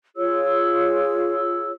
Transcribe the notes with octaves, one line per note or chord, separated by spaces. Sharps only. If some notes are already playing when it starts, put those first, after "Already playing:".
F4 G#4 C#5 E6